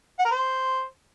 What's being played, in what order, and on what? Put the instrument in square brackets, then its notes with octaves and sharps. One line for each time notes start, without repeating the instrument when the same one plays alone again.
[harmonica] F#5
A#4
C5